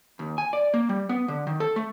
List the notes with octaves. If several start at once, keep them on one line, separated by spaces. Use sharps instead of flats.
D#2
G#5
D5
A#3
G3
B3
D3
D#3
A4
A3